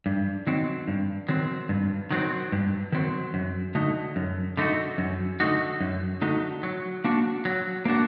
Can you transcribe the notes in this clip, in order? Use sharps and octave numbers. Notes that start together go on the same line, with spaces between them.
G2
D#3 F#3 C4
G2
D#3 F#3 C4
G2
D#3 F#3 C4
G2
D#3 F#3 C4
F#2
D3 A3 D#4 F#4
F#2
D3 A3 D#4 F#4
F#2
D3 A3 D#4 F#4
F#2
D3 A3 D#4 F#4
F#3
A#3 D4 F#4
F#3
A#3 D4 F#4